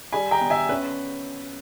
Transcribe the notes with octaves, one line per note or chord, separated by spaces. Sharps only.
G3 G#5 B5
G5 A#5
B3
E5 G#5
C#4 B4